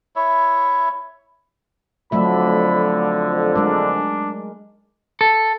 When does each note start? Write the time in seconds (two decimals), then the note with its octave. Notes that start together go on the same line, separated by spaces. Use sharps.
0.16 E4 C#5 E5
2.12 F2 D3 F#3 A3 E5 B5
3.56 G#3 D4 A#4
5.21 A4